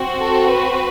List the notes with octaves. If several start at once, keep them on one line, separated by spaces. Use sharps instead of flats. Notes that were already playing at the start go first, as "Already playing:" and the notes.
Already playing: C4 F#4
A4
B4